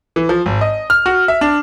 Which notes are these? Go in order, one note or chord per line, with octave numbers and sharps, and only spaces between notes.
E3
F3
G#1
D#5
F6
F#4
E5
D4